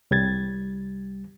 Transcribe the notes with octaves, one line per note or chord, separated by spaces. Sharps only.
C2 G3 G#6 A6